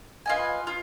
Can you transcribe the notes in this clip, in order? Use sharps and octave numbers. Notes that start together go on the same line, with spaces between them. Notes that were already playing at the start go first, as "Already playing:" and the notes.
F4 B4 D#5 G#5
F4